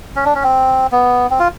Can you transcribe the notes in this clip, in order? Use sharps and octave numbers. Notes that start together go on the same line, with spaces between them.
C#4
D4
C#4
C4
B3
C4
F4